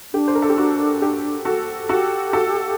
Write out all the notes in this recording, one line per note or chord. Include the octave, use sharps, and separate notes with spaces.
D4 G4
C5
A#4
A4
G4
F#4
G4
F#4 A4
F#4 G4 A4
F#4 A4